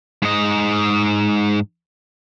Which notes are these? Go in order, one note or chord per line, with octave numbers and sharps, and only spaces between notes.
G#2 D#5